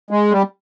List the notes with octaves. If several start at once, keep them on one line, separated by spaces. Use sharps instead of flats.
G#3
G3